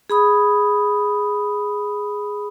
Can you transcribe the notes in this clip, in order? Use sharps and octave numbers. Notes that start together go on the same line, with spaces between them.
G#4 B5 D#6